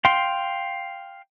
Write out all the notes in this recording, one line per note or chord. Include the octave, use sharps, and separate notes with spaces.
F5 G5 C6